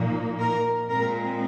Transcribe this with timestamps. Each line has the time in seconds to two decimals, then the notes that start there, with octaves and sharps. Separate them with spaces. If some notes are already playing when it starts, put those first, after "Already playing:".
Already playing: A#2 F3 A#3 D#4
0.39 A#4
0.88 A#2 G#3 C4 A#4